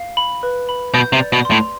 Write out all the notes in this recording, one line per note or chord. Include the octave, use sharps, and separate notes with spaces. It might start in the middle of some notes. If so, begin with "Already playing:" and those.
Already playing: F5
B5
B4
B5
B2 G6
C3
D5
B2
C6
A2